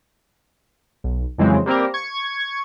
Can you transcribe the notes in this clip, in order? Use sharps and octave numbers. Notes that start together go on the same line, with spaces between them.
B1
F2 C#3 E3 F#3 G#3 C4
G3 A#3 C4 G4 A#4
C#6 G#6